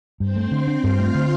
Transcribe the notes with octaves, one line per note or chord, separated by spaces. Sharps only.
G2 C4 C5
A3
D3
D4
G2 F4 F5
A3
D3